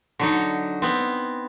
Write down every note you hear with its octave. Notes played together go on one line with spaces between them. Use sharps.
D3 F#3 D#4
B3 C4